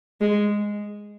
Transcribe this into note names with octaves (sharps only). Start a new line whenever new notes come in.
G#3